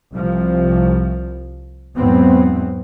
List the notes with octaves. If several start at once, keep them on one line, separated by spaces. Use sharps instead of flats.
C2 F3
E2 G#2 F#3 B3 C4